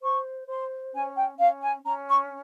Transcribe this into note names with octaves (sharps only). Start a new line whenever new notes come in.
C5 C#6
C5 C6
C#4 G#5
G5
C#4 F5
G#5
C#4 A#5
C#6